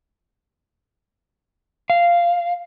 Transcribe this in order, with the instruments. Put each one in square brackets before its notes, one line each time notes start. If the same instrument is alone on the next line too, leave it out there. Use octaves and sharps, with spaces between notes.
[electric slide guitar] F5